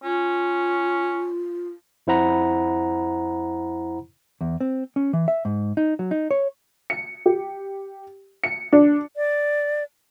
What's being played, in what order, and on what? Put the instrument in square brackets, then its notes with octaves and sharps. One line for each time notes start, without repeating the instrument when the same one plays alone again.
[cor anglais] C#4 [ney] F4
[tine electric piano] F2 E4 C5 F#5 A#5 B5
[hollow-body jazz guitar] E2
C4
C#4
E3
E5
G#2
D#4
F#3
D#4
C#5
[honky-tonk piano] C#7
G4
C#7
D4
[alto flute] D5